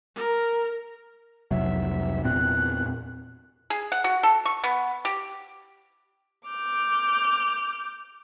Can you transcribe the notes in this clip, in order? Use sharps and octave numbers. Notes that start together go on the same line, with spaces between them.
A#4
F1 C2 F#3 E5
E2 A#2 C4 F#6
G#4
F#5
F#4
A4
C#6
B3
G4
D6 F6 G6